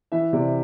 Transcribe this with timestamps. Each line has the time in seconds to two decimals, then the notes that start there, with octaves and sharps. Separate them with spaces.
0.12 E3 E5
0.33 C3 D5